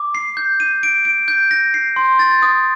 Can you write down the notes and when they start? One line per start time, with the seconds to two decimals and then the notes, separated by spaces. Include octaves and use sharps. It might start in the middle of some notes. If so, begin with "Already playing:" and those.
Already playing: D6
0.15 C7
0.37 G6
0.60 D#7
0.83 D7
1.05 D7
1.28 G6
1.51 A#6
1.74 C7
1.96 C6
2.19 A6
2.42 D#6